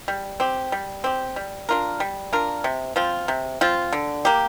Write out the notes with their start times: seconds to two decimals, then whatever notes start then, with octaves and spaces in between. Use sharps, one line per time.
0.08 G3
0.40 C4 G4
0.72 G3
1.04 C4 G4
1.36 G3
1.69 D4 F4 A#4
2.00 G3
2.33 D4 F4 A#4
2.64 C3
2.96 F3 C4 F4
3.28 C3
3.61 F3 C4 F4
3.93 D3
4.25 A#3 G4